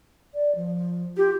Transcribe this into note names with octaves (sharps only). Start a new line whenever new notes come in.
D5
F3
F4 G4